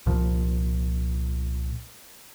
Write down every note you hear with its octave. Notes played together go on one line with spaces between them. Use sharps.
C2 A#2 F3